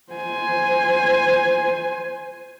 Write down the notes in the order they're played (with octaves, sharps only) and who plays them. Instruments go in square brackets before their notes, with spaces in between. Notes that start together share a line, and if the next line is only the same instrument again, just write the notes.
[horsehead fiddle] C5 G#5